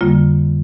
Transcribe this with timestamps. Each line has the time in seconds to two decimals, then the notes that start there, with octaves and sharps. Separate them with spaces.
0.01 F2 D3 G3 A#3 F4